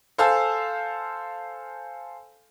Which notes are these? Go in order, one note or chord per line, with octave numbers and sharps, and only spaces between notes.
A4 C5 F5 G#5 A5 E6